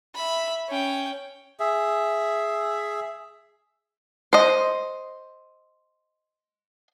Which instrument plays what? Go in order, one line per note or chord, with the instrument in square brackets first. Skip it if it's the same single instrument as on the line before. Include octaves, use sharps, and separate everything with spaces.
[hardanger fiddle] E5 B5
C#4 G5
[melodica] G#4 E5
[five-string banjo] C5 D#5